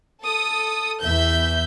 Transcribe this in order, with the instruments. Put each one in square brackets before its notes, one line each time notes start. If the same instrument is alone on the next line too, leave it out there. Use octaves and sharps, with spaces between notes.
[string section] A4 D#6
E2 E3 E5 G6